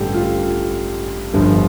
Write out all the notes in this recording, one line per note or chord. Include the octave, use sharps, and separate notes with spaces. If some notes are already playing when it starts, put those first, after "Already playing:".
Already playing: A1 G2 D3 G4 A4
F4
G1 G2 F3